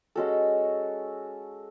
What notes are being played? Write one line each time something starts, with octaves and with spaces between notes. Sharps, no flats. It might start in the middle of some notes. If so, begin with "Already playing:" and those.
G#3 C#4 F#4 A4